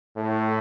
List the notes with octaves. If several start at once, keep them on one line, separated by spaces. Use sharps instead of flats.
A2